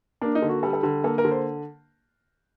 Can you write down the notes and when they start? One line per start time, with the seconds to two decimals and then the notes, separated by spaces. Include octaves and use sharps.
0.21 A#3 D4
0.35 D#4
0.42 D3
0.49 F#4
0.63 G3 A4
0.73 A4
0.83 D3
1.04 A#3 A4
1.18 A#4
1.25 D3
1.31 C5